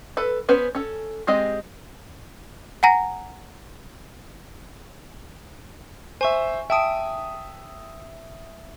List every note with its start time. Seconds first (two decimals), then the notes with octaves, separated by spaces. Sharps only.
0.17 A4 B4 B5
0.49 B3 C#4 B4 C5
0.75 C#4 A4
1.27 G#3 C4 G4 G#4 D#5
2.83 F#5 G#5 A#5 A#6
6.21 C5 E5 G#5 C#6
6.70 E5 G5 A5 D#6 D7